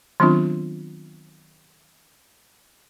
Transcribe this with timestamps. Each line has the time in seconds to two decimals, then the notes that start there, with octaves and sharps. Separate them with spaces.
0.20 D#3 F#3 B3 C4 D4 F4